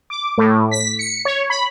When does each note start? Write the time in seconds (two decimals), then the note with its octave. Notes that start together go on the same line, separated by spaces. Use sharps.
0.10 D6
0.38 A2
0.71 B6
0.99 C#7
1.25 C#5
1.50 B5